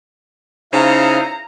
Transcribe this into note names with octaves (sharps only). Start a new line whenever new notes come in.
C#3 D#4 E4 C5 C#5 E5 F5 A#5